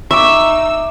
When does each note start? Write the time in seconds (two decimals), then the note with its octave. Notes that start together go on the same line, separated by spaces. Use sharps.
0.11 D#4 E5 C#6 D6 E6